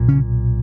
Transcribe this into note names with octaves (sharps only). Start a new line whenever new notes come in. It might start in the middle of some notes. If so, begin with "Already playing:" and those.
Already playing: B1 A#2
C#3 C#4